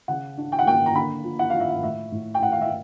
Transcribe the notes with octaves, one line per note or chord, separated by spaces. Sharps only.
C#3 F#5
D4
G5
F#5
A#3 G5
A#5
D3 B5
F3
F#5
F3 F5
E5
F5
A2 E5
A2
G5
A2 F#5
F5
E5